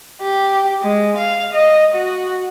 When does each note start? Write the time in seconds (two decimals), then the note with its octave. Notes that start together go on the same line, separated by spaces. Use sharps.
0.22 G4
0.82 G#3
1.18 F5
1.54 D#5
1.94 F#4